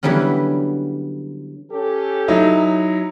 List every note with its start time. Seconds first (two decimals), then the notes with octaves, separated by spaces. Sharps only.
0.03 D3 E3 F#3 G3 B3 C#4
1.72 C#4 G4 A4
2.28 F#3 D#4 E4